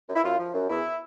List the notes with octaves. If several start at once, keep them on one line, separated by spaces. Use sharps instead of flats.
F#2
E4
F#2 F4
F3
F#2
E2 E4